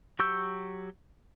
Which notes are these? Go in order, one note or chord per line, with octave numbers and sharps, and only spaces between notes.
F#3 G4 C#6 E6 G6